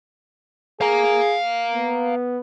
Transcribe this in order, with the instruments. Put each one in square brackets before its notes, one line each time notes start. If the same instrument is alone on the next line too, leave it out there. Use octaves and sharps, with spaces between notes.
[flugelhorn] G#4 [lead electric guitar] F5 A#5
[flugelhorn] B3